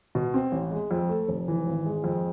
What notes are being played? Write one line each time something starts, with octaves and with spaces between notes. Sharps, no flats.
B2
C4
A1
G#3
F2
A3
F1
E3
G#1
G#3
F2